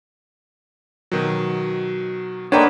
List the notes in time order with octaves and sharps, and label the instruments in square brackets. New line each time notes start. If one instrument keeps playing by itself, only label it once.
[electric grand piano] B2 D#3 F#3
[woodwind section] D3 G#3 A#3 [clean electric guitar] D4 B4 [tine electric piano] C#5 [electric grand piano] F#5 G5